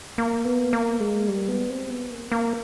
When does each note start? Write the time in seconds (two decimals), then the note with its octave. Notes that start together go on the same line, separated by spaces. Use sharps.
0.18 A#3
0.45 B3
0.73 A#3
1.00 G#3
1.28 G3
1.48 B3
1.70 C4
1.90 B3
2.11 A#3
2.32 A#3